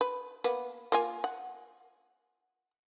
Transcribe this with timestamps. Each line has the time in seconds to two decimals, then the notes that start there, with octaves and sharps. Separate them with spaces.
0.01 B4
0.44 A#3 B3 B4
0.92 A#3 F4 G#5
1.24 F#5